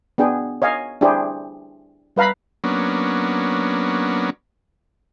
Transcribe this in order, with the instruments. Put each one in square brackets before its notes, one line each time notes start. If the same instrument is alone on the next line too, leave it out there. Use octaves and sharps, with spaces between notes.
[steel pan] B3 D4 G#4 G5
C#5 D#5 F5 G#5
D4 E4 G4 G#4 C5
G3 B4 F5 A#5 B5
[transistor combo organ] F#3 A#3 B3 C#4 D4